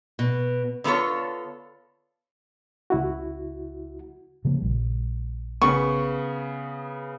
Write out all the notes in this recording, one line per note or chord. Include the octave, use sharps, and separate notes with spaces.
B2
D3 B3 F4 A4 C#5
C#2 E4 F#4
C#3 F3 A#3
A#1 G3
C#3 B3 C#6